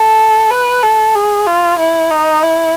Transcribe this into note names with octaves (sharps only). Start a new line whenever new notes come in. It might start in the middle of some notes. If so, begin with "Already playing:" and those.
Already playing: A4
B4
A4
G#4
F4
E4
D#4
E4